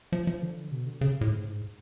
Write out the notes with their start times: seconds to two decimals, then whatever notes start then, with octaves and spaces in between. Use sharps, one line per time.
0.13 F3
0.27 F3
0.42 D3
0.72 B2
0.87 D3
1.01 C#3
1.21 A2
1.30 G#2